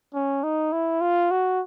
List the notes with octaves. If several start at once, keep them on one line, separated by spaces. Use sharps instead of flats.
C#4
D#4
E4
F4
F#4